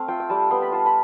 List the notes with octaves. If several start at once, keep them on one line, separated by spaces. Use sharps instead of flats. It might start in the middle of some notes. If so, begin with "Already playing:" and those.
Already playing: A3 C4 F5
F4 G5
G5
G3 A5
B3 C6
B5
F4 A5
B5